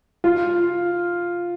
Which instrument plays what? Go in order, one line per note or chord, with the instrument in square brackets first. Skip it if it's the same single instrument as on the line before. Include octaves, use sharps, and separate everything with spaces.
[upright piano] F4